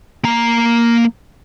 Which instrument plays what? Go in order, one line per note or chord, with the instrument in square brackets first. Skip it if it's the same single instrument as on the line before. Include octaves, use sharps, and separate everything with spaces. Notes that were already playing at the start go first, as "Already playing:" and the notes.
[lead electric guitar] A#3 A#5